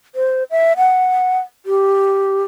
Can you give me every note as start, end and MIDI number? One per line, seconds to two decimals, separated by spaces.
0.15 0.44 72
0.51 0.73 76
0.77 1.39 78
1.66 2.44 67